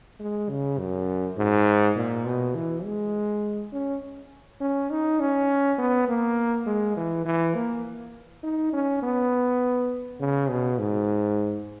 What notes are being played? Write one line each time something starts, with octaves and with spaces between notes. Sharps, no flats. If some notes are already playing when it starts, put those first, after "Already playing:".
G#3
C#3
F#2
G#2
A#2
B2
E3
G#3
C#4
C#4
D#4
C#4
B3
A#3
G#3
E3
E3
A#3
D#4
C#4
B3
C#3
B2
G#2